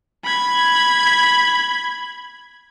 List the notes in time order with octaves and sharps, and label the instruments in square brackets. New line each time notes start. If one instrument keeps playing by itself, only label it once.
[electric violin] B5 G#6